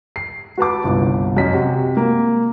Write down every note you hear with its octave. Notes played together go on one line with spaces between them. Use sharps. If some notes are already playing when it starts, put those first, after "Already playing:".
C7
F#4 B4 A5 D6
G1 C2
F#2 D#5 B6
C3 F#4
A#3